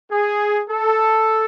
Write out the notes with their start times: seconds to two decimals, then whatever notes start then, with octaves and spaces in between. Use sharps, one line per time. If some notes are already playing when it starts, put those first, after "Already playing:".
0.12 G#4
0.70 A4